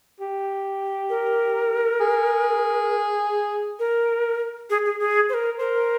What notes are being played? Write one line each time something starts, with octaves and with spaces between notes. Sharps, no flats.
G4
A#4
G#4
A#4
G#4
G#4
G#4
C5
A#4
A#4 C5